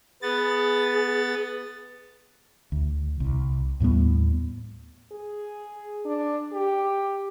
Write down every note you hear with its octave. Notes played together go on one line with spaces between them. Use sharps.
B3 G#4 A6
D2
C2
D#2 A2 G3 B3
G#4
D4
G4